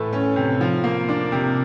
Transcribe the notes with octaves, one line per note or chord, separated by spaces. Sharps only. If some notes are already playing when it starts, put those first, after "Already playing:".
Already playing: A2 E3 A3
C#4
C3
F3
A#3
D4
C3